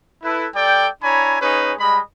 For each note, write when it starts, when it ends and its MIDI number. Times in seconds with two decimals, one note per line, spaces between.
0.23 0.47 64
0.23 0.47 69
0.23 0.47 71
0.55 0.88 55
0.55 0.88 69
0.55 0.88 74
0.55 0.88 79
1.03 1.40 62
1.03 1.40 64
1.03 1.40 73
1.03 1.40 80
1.03 1.40 82
1.03 1.40 83
1.40 1.73 61
1.40 1.73 63
1.40 1.73 68
1.40 1.73 71
1.40 1.73 73
1.79 2.00 55
1.79 2.00 56
1.79 2.00 75
1.79 2.00 83